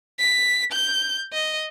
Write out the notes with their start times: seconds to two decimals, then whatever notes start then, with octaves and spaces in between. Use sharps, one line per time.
0.19 B6
0.72 G6
1.33 D#5